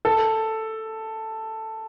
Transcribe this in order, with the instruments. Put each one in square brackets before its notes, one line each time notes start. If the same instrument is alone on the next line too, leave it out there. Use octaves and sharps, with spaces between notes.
[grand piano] A4